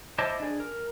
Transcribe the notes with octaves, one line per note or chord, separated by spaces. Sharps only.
E4 C5 D#5 A5 D6
D4 G#4
A#4